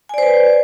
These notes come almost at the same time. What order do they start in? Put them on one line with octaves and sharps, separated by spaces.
G#5 D5 C5 B4